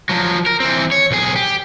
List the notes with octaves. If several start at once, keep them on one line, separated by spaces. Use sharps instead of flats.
F3 F#3
A#4
E3 C4
C#5
B1 G#4
G4